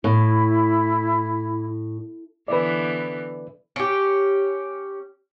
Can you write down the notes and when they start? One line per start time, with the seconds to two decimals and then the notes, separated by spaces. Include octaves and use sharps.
0.04 A2 E4
2.48 D3 E3 B3 B4 D5
3.76 C#4 G4